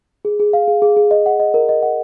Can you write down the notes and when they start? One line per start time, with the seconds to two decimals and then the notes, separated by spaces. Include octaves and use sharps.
0.25 G#4
0.40 G#4
0.53 F5
0.68 G#4
0.82 G#4
0.97 G#4
1.11 D#5
1.26 F#5
1.40 D#5
1.54 A#4
1.69 D#5
1.83 F#5